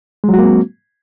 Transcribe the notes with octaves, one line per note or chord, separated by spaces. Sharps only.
F#3 G#3 A#3 C4 F#4